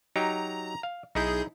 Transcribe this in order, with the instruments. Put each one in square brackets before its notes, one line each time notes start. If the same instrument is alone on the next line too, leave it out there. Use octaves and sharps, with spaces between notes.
[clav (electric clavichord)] F#3 D#4 G4 [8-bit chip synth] A#5
[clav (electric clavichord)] F5
[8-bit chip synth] B1 G#4 G6 [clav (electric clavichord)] D#4 E4